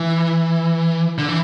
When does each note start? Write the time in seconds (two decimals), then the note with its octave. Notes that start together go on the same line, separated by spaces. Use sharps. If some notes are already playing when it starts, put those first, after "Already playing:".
Already playing: E3
1.18 D3
1.28 E3